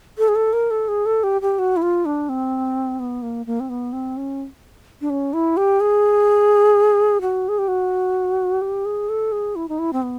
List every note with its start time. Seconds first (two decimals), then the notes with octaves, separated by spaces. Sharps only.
0.18 A4
0.28 G#4
0.35 A4
0.53 A#4
0.71 A4
0.88 G#4
1.06 A4
1.23 G4
1.42 G4
1.59 F#4
1.77 E4
1.82 F4
2.05 D4
2.29 C4
2.99 B3
3.22 A#3
3.46 A#3
3.60 C4
3.69 B3
3.93 C4
4.17 C#4
5.01 D4
5.10 C#4
5.33 E4
5.57 G4
5.80 G#4
7.21 F#4
7.49 G#4
7.59 G4
7.68 F#4
8.62 G4
8.85 G#4
9.09 A4
9.32 G#4
9.56 E4
9.69 D#4
9.79 E4
9.93 C4
10.02 B3